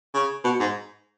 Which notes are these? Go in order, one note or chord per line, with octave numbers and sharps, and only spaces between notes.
C#3
B2
G#2